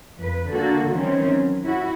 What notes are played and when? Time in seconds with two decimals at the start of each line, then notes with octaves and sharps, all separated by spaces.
0.17 F2 B4
0.51 D3 A#3 F#4 A4
0.89 D#3 E3 G3 C4 C#4
1.29 F#3
1.64 E4 F#4